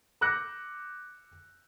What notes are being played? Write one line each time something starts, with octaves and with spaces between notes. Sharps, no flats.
D6 E6 F#6 G6 A#6 C#7